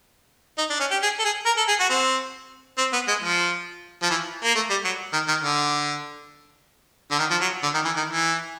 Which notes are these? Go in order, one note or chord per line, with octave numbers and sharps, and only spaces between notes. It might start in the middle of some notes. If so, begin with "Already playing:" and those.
D#4
D4
C#4
G4
G#4
A4
G#4
A#4
A4
G#4
F#4
C4
C4
B3
G#3
F3
F3
E3
A#3
A3
G3
F#3
D#3
D#3
D3
D3
D#3
F3
F#3
D3
D#3
E3
D#3
E3